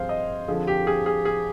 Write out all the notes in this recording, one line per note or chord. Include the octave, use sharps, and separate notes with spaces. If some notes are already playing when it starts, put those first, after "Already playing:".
Already playing: G2 F3 C4 G#4 C5 F5
D#5
F2 D3 F3 G#4
G4
G#4
G#4
G#4